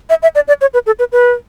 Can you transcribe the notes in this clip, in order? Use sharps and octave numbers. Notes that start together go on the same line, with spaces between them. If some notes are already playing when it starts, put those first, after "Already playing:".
E5
E5
D5
D5
C#5
B4
A4
B4
B4